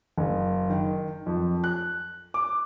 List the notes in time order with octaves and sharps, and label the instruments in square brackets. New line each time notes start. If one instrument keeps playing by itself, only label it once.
[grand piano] F#1
D#3
F2
F#6
D6